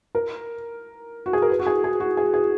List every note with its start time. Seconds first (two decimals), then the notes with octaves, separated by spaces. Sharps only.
0.15 A#4
1.26 F#4
1.33 G#4
1.42 A#4
1.50 B4
1.59 F#4
1.66 G#4
1.84 G#4
2.00 F#4
2.17 G#4
2.34 G#4